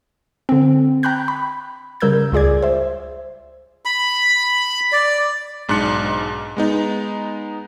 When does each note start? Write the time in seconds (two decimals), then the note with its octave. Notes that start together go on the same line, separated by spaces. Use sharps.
0.49 D3 C4
1.03 G5 A#5 B5 F#6 G6
1.28 B5
2.00 C#3 G3 A#4 E6 G6 G#6
2.32 C#2 F4 G#4 D5 G#6
2.63 C5 E5
3.85 B5
4.92 D5
5.68 B1 G#2 D4 F#6 C#7
6.57 G#3 B3 D#4